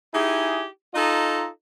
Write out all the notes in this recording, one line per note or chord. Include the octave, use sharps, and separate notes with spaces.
D#4 E4 G4 G#4
D#4 F4 A4 D#5 A#5